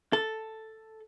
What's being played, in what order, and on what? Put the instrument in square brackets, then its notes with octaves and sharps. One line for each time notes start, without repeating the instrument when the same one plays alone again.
[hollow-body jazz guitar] A4